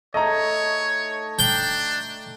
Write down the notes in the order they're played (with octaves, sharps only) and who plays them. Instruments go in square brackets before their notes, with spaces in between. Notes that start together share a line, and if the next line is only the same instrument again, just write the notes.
[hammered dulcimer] A3 D#4 [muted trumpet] C#5 [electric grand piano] D#5 A#5
[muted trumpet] D4 [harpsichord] G5